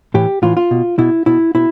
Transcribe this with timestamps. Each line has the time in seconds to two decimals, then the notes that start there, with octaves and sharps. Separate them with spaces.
0.14 A2 E3 G4
0.42 A2 E3 F4
0.57 F4
0.71 B2
0.98 B2 E4
1.26 B2 E4
1.55 B2 E4